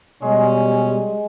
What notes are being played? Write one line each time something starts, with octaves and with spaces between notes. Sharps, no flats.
B2 G3 G#3 C#4